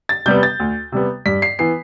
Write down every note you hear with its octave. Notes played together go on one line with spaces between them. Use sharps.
A6
C3 G3 B3 G6
A6
D2
C3 G3 B3
G2 B6
C7
E3 B3 C7